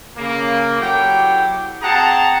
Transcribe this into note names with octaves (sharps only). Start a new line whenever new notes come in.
C#3 A#3
F#3 E4 G4 A4 G5
C4 F#4 G#4 F#5 A5 A#5